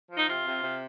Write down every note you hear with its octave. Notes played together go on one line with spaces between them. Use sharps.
F3
D#4
C3 F4
C3
C3